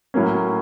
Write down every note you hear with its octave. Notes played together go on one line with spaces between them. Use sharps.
A2 F#3 A#3 C#4